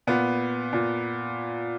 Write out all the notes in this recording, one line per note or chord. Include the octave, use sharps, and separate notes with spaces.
A#2 B3
A#2